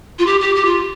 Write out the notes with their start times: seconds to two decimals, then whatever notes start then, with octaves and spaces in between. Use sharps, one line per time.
0.19 F4
0.27 G4
0.40 G4
0.55 G4
0.65 F4